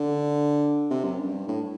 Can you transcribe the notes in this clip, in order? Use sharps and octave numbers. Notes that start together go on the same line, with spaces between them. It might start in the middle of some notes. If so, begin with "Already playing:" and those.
Already playing: D3
C3
F#2
G2
A2